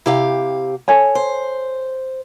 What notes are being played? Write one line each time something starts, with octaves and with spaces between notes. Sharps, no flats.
C3 E4 G4 F5
A4 C#5 G#5
C5